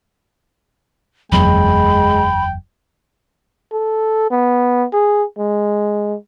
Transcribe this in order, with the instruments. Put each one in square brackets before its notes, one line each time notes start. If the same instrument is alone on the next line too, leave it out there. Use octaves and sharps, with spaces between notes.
[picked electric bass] F#1 E2 F#3 [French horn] G#3 [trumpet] G5 [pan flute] B5
[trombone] A4
B3
G#4
G#3